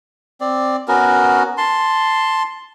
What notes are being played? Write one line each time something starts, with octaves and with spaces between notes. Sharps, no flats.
C4 D5
B3 C#4 F#4 A#4
A5 C6